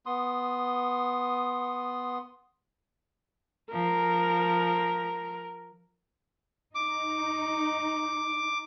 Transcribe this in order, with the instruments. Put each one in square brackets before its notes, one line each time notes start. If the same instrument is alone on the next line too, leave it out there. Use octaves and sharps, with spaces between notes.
[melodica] B3 C6 D#6
[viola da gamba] F3 [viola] A#4
[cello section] D#4 [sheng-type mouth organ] D6